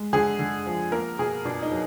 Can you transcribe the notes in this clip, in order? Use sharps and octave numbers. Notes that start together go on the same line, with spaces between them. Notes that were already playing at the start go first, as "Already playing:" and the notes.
Already playing: G#3
D3 G#4
D3
F3
A#3 A#4
B2 G#4
B2 D4
D#4
F#3